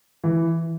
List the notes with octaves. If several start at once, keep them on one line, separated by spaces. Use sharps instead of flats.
E3